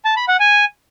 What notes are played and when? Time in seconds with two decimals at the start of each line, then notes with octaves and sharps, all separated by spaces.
0.05 A5
0.16 B5
0.28 F#5
0.40 G#5